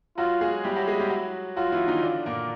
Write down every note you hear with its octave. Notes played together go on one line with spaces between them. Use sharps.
F#3 F4 F#4
G#3 G#4
G3 E4 G4
F#3 F#4
G#3 G#4
G3 G4
F#3 F#4
F#3 F4 F#4
E3 E4
D#3 D#4
D3 D4
A#2 A#3